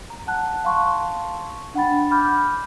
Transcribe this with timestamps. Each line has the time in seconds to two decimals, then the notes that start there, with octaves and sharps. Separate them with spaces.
0.10 A#5
0.27 F#5 A5 F#6
0.65 F5 A5 C6 C#6
1.74 D4 F#5 G5 B5 A6
2.11 B5 D6 F6 G6